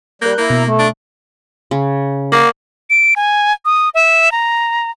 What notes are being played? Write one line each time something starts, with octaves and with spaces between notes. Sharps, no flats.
G3 A#3 A#4 F#6 G6
A#3 E4 A#5
B2
A3
D4
C#3
A#3 A#4 D5 F#5
D7
G#5
D#6
E5
A#5